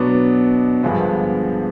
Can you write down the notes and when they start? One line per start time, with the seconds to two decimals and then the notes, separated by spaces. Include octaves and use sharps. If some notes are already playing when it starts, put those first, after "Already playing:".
Already playing: B2 F#3 B3 D4
0.83 G2 D3 F3 G#3 B3